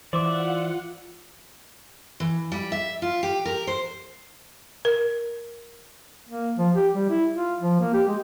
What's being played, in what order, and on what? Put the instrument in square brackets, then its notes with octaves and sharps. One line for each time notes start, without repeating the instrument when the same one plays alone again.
[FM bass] E3 [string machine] F4 F#5 [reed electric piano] C5 D6 [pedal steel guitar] D5 E5
[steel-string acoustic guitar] E3
G3
E5
F4
G4
A#4
C5
[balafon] A#4
[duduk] A#3
F3
G4
G3
E4
F4
F3
A#3
G4
G#3